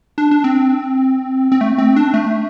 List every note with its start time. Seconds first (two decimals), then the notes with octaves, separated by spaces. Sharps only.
0.18 D4
0.31 D4
0.44 C4
1.52 C4
1.61 A3
1.78 C4
1.96 D4
2.14 A3